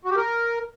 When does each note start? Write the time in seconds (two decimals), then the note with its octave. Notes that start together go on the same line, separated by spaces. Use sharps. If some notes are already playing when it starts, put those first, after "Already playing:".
0.05 F#4
0.11 G4
0.16 A#4